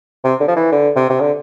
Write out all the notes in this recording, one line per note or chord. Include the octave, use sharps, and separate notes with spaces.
C3
D3
F3
E3
D3
C3
C3
D3